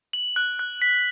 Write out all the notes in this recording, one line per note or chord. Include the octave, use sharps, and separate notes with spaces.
F#7
F#6
F#6
B6